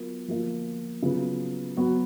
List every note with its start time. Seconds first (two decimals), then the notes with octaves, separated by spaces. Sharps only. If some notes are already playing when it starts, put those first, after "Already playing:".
Already playing: F#3 B3 F4 A#4
0.28 F3 A#3 F4
1.02 C#3 F#3 B3 F4 B4
1.77 F#3 B3 F#4